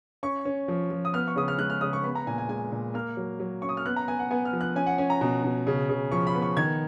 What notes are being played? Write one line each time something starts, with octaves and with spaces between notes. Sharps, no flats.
C#4 C#6
C#4
F3
F3
D#6
B3 F6
C#6
C#3 D#6
F6
G#3 F#6
F6
C#3 D#6
C#6
B3 B5
A#5
A#2 G#5
G#5
G#3 G#5
A#2
A#3 F6
F#3
F#3
C#4 C#6
D#6
F6
B3 F#6
A#5
B3 G#5
F#5
B3 G#5
F6
F3
F#6
C#4 G#5
F#5
C#4 G#5
A#5
B2
B2
C#3
C#3
F3 C#6
B5
B3
C#6
D#3 G#6